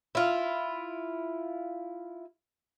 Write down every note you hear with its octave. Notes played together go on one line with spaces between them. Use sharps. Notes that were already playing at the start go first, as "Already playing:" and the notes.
E4 F4